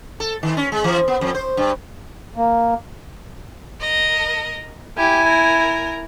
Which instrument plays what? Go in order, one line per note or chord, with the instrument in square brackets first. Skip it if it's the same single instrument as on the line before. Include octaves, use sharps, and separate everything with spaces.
[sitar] A4
D#3
C#4
G#3
E3
B3
F2
C5
G2
[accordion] A#3
[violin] A#4 D#5
[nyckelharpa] E4 G#5 [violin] G4
[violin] A#4